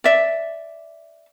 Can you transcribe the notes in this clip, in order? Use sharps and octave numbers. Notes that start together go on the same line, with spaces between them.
D5 E5